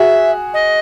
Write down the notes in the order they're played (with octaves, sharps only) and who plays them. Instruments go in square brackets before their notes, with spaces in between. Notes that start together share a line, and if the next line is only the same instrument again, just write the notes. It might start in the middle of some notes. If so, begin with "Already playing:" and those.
Already playing: [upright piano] F#4 G#4 [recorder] E5
[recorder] D#5